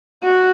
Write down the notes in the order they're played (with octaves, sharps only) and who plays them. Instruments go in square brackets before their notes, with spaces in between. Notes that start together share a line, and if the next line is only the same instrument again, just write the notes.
[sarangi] F#4